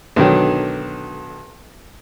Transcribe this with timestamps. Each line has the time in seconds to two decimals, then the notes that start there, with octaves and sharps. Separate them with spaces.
0.16 B1 D3 D#3 F#3